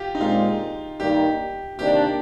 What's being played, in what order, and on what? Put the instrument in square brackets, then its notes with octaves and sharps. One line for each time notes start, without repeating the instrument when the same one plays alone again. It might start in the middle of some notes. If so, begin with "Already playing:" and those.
Already playing: [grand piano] F4 G4
D#4
[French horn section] A#2 G#3 C4 [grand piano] F4
[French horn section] G2 D#3 G3 A#3 D#4 [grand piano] G4
[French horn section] C3 D#3 A#3 D4 [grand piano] G4